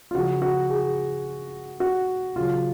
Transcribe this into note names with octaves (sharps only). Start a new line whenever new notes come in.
F4
C#3 F3 F#4
F#4
G#4
F#4
C#3 F#3 F4